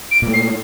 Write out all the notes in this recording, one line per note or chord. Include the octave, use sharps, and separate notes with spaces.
D7
A#2 A3
C7